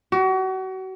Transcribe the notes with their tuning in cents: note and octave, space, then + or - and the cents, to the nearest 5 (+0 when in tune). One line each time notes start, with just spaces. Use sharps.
F#4 +35